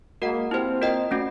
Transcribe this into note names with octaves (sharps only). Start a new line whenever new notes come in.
G#3 A#3 F#4 A#4 D#5 F#5
A#3 C4 E4 G4 C5
F4 A#4 D#5 G5
A3 C#4 F#4